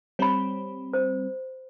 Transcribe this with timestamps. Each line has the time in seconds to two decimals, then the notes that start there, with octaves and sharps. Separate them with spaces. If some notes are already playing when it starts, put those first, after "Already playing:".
0.19 G3 C4 C#5 B5
0.93 C5